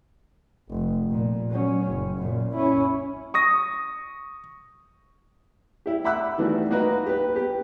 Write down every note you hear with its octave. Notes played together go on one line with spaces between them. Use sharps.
F1
A#2
F#3 C#4
F#1
F#2 A#2
C#4 E4
C#6 D#6 A#6
E4 G4
E5 F#5 B5 D6 E6 F#6
D#3 E3 G3 A3 F#4
A#3 D#4 F#4 A#4 B4
G4 B4
B3 G4